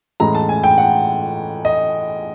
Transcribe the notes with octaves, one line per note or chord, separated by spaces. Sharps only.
A2 E3 G#3 C#4 A#5
A5
G#5
G5
F#5
D#5